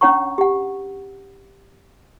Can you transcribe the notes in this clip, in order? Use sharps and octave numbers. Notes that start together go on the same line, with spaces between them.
C#4 D4 C#5 F#5 A#5 C#6
G4 F#5